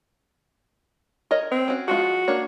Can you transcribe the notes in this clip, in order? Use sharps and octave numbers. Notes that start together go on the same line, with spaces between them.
A#4 C#5 D#5
C4
C#4 F#4
F3 G#3 F4 F#4
A#3 D4 C#5